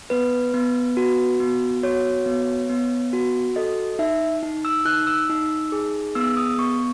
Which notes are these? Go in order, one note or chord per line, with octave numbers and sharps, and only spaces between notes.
B3 B4
B3
F#4
B3
F#4 C#5
B3
B3
F#4
A4 D#5
D#4 E5
D#4
E6
D#4 F#6
E6
D#4
G#4
B3 E6
D#6
B3 C#6